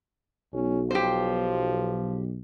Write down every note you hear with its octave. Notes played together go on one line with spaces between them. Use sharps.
B1 C#4
F3 G4 C5